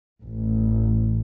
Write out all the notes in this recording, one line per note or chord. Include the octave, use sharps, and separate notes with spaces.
A1